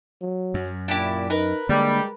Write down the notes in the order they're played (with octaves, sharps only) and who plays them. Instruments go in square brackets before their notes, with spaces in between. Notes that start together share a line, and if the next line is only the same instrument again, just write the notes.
[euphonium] F#3
[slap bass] F#2
[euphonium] A#2 [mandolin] D4 E4 G4
[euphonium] D#4 [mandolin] A#4 B4
[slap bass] D3 A#3 [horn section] G3 [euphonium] G#3